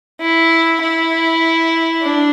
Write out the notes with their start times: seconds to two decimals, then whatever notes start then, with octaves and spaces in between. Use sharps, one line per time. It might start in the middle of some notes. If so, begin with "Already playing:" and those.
0.21 E4
0.82 E4
2.03 D4